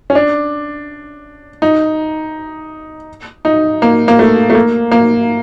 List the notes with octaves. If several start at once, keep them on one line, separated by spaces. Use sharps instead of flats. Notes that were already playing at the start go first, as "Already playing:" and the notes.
C#4
D4
D#4
D#4
A#3
A#3
A3
A3
A#3
A#3